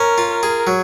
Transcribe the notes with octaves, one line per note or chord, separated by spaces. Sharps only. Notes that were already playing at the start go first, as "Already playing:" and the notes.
Already playing: C#4 A#4
F4
A#4
G#4
F#3